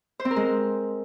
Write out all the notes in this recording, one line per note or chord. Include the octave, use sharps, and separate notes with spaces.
C5
C4
A#4
G#3